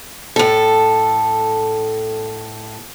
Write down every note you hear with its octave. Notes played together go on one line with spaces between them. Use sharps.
A2 A4